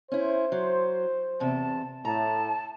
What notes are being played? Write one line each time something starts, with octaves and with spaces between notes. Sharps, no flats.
C#4 E4 C5
F#3
E2 C3 A5
A2 A5 A#5